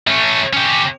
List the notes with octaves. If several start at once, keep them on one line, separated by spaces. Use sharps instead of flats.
A3 C#4
C#4 G4